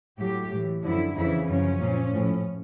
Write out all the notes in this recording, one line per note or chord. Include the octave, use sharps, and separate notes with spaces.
A2 F#3 G4
A2 E3
F#2 D3 F3 E4
F2 C#3 E3 E4
F#2 C#3 F3 C#4
A#2 F3
A2 F3